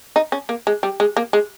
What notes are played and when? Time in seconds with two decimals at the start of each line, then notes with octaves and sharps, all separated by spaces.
0.16 D#4
0.32 C#4
0.49 A#3
0.67 G#3
0.83 G3
1.00 G#3
1.17 A#3
1.33 G#3